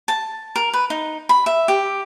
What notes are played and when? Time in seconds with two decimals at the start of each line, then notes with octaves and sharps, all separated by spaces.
0.08 A5
0.56 A#4
0.73 B4
0.90 D#4
1.29 B5
1.46 E5
1.68 G4